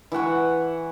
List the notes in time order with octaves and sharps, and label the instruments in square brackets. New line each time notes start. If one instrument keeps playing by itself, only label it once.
[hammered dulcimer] E3 E5 F#5 C#6